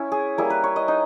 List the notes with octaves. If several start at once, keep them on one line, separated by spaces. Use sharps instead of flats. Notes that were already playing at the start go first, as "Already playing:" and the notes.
Already playing: C#4 E4
G#4
G3 A#3 E4 G#4
B4
C#5
D#5
D#4